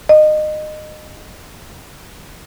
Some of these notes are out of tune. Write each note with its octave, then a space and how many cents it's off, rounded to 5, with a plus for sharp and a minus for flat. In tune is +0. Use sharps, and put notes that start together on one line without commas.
D#5 -25